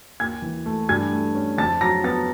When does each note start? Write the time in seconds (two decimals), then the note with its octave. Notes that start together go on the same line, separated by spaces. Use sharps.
0.20 D#2 G#5 G#6
0.42 E3
0.66 A3
0.89 G2 G#5 G#6
1.12 A3
1.35 C#4
1.58 F2 A5 A6
1.81 F#3 A#5 A#6
2.04 B3 A5 A6